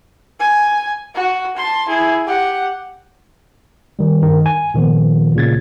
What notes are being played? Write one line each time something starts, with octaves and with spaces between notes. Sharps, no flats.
G#5
F#4
A5 C6
E4 G#4
G4 F#5
D#3 G3
G2 D#3
G#5
A#2 D#3 F3 B3
A#2 C#3 G#6 A6